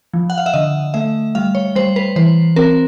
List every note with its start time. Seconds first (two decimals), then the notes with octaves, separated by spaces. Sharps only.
0.14 F3
0.30 F#5
0.38 F5
0.46 E5
0.54 D3 D#5
0.94 A3 E5
1.35 G3 F5
1.55 C#5
1.76 G3 C5
1.96 B4
2.16 E3 C5
2.56 C4 A#4